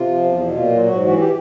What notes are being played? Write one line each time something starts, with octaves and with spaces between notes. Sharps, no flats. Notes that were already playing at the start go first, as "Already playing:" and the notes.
Already playing: C3 F4
F3
E2
B2
A#2 F4
F#3
G#2 F#4
E3 F#4
G4